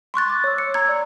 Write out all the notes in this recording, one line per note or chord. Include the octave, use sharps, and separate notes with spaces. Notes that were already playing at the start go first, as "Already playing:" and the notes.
C6 C#6 F#6 A6
D6
C#5 E6
C#7
A#5 E6 G#6
D5 G#6